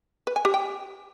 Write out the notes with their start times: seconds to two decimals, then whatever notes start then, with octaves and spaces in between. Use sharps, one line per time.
0.27 B4
0.36 G#5
0.45 G4
0.54 G5